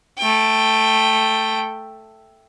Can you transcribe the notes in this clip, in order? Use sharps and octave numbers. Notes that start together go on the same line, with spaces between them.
A3 G5